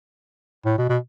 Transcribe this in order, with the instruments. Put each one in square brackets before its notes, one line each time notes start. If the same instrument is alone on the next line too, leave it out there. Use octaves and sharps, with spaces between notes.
[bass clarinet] A2
B2
B2